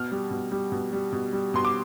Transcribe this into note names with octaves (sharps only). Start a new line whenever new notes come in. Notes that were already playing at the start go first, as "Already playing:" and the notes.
Already playing: B2 F6
G3
B2
G3
B2
G3
B2
G3
B2 C6
D6